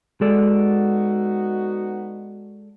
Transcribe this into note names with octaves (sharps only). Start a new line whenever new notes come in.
G#3 B3 D#4 F#4 A4 D5